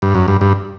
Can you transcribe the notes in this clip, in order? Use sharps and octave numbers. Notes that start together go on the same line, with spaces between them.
G2
F#2
G2
G2